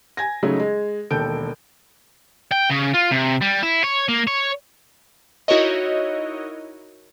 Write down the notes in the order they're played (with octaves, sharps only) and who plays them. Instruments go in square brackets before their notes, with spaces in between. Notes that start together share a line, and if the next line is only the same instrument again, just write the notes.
[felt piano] G#5 G#6 A#6
C#3 F#3 G#3 A3 D#4
G#3
E1 D#2 A4 G6 D7
[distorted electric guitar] G5
C#3
F4
C3
G3
E4
C#5
A#3
C#5
[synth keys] D#4 E4 F#4 A#4 C#5 D#5